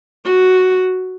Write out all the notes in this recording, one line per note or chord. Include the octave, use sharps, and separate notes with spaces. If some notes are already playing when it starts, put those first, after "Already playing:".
F#4